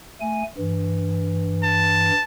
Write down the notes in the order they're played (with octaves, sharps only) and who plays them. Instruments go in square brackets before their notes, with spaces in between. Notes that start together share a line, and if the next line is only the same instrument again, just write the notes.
[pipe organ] A3 G#5
G2 E3
[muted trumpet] A5